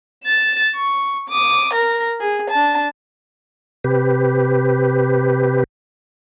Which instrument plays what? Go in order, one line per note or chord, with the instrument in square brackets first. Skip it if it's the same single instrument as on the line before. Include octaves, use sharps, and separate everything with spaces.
[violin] A6 E7
C#6
D6 D#6
A#4 A#6
G#4
D4 A5
[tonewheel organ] C3 G4 B4